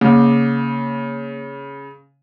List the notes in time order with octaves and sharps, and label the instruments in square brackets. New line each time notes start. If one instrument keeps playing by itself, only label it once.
[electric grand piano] C#3 [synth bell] A#3